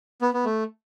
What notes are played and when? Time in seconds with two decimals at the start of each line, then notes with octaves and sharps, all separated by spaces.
0.21 B3
0.33 B3
0.45 A3